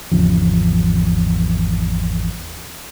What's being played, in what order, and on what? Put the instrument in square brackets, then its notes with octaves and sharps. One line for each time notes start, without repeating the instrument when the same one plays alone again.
[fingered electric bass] G#1 E2 C#3 F3